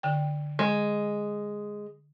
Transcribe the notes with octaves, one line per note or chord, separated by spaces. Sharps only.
D3 G5
G#3